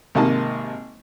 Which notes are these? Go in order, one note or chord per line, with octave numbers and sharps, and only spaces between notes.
G#1 C3 A#3 D#4 D#5 A5